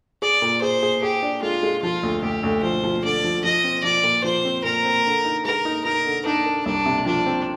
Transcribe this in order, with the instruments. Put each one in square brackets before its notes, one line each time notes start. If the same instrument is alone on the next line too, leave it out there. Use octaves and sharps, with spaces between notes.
[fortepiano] G#4 [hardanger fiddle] D5
[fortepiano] A#2
[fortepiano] G#4 [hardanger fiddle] C5
[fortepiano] G#4
[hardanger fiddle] G4 [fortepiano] G#4
[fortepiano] D4
[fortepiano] G#3 [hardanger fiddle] F4
[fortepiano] G#3
[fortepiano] F3 [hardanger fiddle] F4
[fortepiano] D2
[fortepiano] D2 [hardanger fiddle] G4
[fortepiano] D2
[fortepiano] F3 [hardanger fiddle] C5
[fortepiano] F3
[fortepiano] D3 [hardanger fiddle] D5
[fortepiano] F3
[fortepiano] F3 [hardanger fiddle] D#5
[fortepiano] C4
[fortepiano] F3 [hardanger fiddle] D5
[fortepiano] A#2
[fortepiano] F3 [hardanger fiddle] C5
[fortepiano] C4
[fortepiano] A#2 [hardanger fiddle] A#4
[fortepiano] C4
D3
D#4
[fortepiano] G#3 [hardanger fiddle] A#4
[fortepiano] D#4
[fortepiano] D#4 [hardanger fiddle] A#4
[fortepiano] D3
[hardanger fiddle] D4 [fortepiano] D#4
[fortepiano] A#4
[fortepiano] C2 [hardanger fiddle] D4
[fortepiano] C3
[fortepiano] F3 [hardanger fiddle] D4
[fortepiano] C4